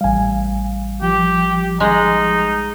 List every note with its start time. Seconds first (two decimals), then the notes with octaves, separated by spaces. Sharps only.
0.01 A1 G3 F5 G#5
1.02 F3 G4
1.80 G#3 D#4